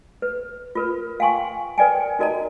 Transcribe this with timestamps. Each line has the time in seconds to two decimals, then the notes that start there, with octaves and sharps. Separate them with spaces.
0.22 B4
0.75 F4 A#4 B4
1.20 F5 G5 G#5 C6 C#6
1.78 A#4 B4 D5 G5 G#5
2.19 D#4 F#4 A#4 D5 D#5 A#5